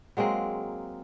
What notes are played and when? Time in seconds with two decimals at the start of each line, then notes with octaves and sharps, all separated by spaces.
0.17 F#3 G#3 A#3 C4